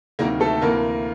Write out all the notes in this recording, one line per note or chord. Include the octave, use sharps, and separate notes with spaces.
D2 C3 D#3 F#3 A#3 A#4
A3 A4
D2 C3 E3 A#3 A#4